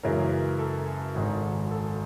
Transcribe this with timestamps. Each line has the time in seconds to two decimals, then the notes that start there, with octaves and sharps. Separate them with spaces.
0.03 F#2 C#3 E3 G#3 C#4 A#4
0.59 A4
1.15 G#1 G#2 D#3 G#3
1.71 A4